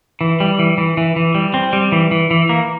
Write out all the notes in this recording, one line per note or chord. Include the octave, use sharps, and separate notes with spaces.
E3
G3
E3
E3
E3
E3
G3
C4
G3
E3
E3
E3
A#3